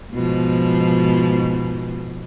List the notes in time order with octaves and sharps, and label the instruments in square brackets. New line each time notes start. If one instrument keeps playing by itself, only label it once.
[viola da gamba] G#2 B2 F3